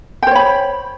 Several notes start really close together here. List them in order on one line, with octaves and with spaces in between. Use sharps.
G5 C5 C#5 B5